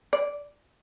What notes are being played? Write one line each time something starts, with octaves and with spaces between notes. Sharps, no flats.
D5